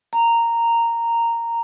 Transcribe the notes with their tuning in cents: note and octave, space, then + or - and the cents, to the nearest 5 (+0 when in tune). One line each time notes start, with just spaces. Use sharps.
A#5 -10